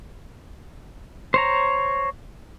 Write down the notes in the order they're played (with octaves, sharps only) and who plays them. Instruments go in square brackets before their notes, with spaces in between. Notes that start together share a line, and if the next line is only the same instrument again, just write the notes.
[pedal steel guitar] C5 C#5 A#5